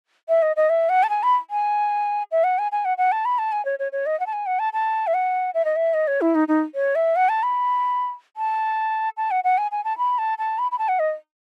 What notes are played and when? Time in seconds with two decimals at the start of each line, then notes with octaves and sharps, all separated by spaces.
0.29 E5
0.42 D#5
0.56 D#5
0.69 E5
0.89 F#5
1.03 A5
1.09 G#5
1.23 B5
1.50 G#5
2.31 E5
2.44 F#5
2.58 G#5
2.72 G#5
2.85 F#5
2.98 F#5
3.12 A5
3.25 B5
3.38 A5
3.52 G#5
3.65 C#5
3.79 C#5
3.92 C#5
4.06 D#5
4.20 F#5
4.26 A5
4.33 G#5
4.46 F#5
4.59 A5
4.73 A5
5.07 E5
5.14 F#5
5.54 E5
5.65 D#5
5.76 E5
5.94 D#5
6.07 C#5
6.21 E4
6.35 D#4
6.48 D#4
6.75 C#5
6.95 E5
7.16 F#5
7.29 A5
7.43 B5
8.37 A5
9.17 A5
9.31 F#5
9.44 F#5
9.58 G#5
9.71 G#5
9.84 A5
9.98 B5
10.18 A5
10.38 A5
10.58 B5
10.71 B5
10.78 A5
10.88 F#5
10.99 D#5